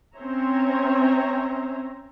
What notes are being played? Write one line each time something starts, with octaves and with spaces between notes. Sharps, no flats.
C4 C#4 C5 C#5 E5 A#5